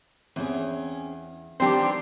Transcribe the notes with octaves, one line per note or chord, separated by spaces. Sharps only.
E2 C4 C#4 G#4
D#3 G3 B3 C4 D4 G4 C6